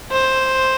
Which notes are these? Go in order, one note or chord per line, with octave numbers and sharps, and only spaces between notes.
C5